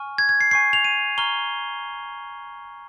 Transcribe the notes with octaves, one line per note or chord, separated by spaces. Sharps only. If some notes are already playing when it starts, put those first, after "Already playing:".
Already playing: G#5 C#6 F6
G#6
G#6
C7
G#5 C#6 G6 C7
F7
D#7
A#5 C#6 F6 G7